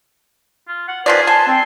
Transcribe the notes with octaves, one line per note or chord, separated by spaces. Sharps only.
F4
F#5
D#3 F3 G#4 B4 D5
G#5 A5 C6
C4